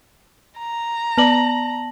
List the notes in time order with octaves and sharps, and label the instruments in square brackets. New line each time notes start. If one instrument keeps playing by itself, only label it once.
[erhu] A#5
[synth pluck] B3 D5 [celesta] A5 A#6 F#7